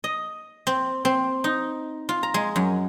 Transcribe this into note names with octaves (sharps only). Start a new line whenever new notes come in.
D#5
C4
C4
D#4
F4
A#5
G#3
F#2